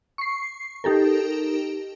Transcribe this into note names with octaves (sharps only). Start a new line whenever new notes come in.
C#6 C7
D#4 G4 A4 A#4